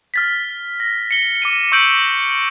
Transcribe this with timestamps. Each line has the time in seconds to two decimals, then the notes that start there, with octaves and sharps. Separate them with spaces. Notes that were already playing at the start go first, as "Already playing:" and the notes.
0.14 F6 A6 B6
0.80 A#6
1.11 C#7 G7
1.42 D6 C#7 D#7
1.72 C#6 D6 E6 G6 D7 F#7